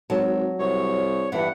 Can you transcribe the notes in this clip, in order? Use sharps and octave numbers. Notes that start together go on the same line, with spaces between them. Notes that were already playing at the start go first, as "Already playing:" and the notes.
G#1 F#3 A5
C2 C#5
G2 E3 B3 F#5